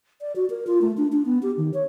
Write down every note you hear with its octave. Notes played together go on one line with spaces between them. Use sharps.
D5
F#4
A#4
F4
A3
D4
D4
B3
G4
D#3
C#5